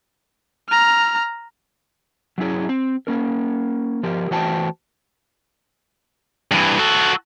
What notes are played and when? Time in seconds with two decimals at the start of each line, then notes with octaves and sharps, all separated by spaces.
0.69 A#5 F6
2.38 F#3 C#4 E4 G#4
2.69 C4
3.07 A#3 C#4 A#4
4.03 F3 G4 A#4
4.31 E3 A3 F#4 C5 G5 A5
6.51 G2 E3
6.79 F#4 A4